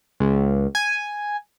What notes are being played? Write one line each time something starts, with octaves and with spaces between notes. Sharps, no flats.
C#2
G#5